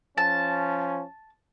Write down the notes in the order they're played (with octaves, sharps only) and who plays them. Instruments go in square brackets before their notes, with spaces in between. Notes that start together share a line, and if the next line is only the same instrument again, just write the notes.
[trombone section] F3 C#4 [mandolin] A5